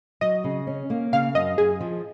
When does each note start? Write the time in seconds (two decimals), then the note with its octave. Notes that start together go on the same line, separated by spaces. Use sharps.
0.21 F#3 D#5
0.44 C#3
0.67 C#4
0.90 A#3
1.13 C#3 F5
1.35 F#2 D#5
1.58 F#2 G#4
1.81 F3